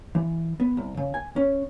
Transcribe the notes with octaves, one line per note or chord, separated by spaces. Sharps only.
E3
B3
C2
C#3
G#5
C#4